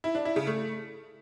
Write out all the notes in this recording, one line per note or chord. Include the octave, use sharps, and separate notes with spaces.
E4
D4
E4
C#3
A3